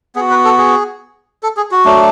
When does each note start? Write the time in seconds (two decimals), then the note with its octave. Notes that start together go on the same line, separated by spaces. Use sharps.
0.16 B3 G#4
0.20 F#4
0.30 B4
0.45 A4
0.58 G#4
1.43 A4
1.57 G#4
1.71 F#4
1.85 F#3 A3 D4